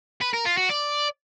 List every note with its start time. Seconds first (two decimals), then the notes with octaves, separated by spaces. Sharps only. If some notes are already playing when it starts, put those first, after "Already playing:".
0.22 B4
0.34 A#4
0.46 F4
0.57 F#4
0.69 D5